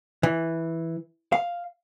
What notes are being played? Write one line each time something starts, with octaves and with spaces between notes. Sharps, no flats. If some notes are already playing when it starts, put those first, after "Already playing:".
E3
F5